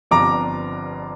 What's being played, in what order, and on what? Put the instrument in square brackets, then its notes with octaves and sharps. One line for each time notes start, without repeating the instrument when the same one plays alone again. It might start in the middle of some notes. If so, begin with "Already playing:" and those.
[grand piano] G1 G2 F3 C4 F4 A#5 D6